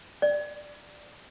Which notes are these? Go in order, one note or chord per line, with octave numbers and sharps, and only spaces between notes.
D5